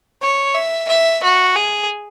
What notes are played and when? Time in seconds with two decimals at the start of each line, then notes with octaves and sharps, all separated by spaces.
0.21 C#5
0.55 E5
0.89 E5
1.23 F#4
1.56 G#4